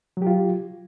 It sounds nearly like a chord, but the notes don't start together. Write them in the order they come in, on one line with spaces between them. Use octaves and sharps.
F#3 G4 F4